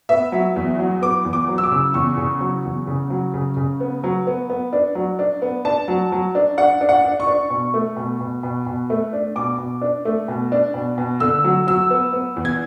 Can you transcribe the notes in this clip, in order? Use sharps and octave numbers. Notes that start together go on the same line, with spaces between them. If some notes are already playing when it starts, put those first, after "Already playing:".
B3 E5
F#3
E2
F#3
B3 D6
E2
D6
F#3
E6
D6
C#3
E2 C#6
C#3
F#3
E2
C#3
F#3
C#3
C#3
B3
F#3
B3
B3
D4
F#3
D4
B3
D4 A5
F#3
F#3
D4
D4 F#5
D4
F#5
D4
C#6
D4
B2
A3
B2
B2
B2
B2
A3
D4
B2 D6
B2
D4
A3
B2
D4
B2
B2
D3 E6
F#3
F#3 E6
B3
B3
E2
G#6